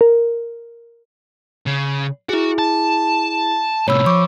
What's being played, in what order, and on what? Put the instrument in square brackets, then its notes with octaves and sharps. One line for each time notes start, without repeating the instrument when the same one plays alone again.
[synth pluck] A#4
[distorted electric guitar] C#3
[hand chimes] E4 G#4 [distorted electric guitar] F#4
[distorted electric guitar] A5
[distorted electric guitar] A2 C3 [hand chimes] C#5 B5 E6
[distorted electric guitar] F3 [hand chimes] C#6 D6